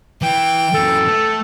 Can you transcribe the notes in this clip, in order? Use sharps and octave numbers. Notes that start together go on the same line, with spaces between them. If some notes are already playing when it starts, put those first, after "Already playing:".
E3 G5
F#2 E3 A4
A3